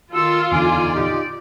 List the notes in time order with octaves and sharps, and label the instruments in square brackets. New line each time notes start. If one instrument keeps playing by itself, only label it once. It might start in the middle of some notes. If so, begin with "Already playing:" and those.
[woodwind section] D#3 E6 [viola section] F4 [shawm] A4
[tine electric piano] E2 D3 [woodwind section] D#4 G#5 [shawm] D5
[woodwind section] A#2 D#4 G4